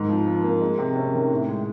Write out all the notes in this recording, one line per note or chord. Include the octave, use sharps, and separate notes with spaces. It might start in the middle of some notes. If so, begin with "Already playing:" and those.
Already playing: G#2 D#3
F3
F3
A#3
G#3
C3
C#4
D#3
A2
G#3